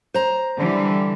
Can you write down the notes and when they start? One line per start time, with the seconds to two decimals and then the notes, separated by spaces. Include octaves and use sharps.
0.14 C5 A#5
0.58 D3 E3 G3